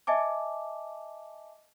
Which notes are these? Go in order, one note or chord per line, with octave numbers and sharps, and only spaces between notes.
D#5 E5 G#5 A5 D6